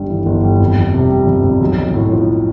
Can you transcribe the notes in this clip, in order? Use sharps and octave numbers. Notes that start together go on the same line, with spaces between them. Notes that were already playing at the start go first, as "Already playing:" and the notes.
Already playing: G1 G2 G3
E3
G1
G3
F2
F2
C3
G3
F2
F2
B1
B1
A2
F3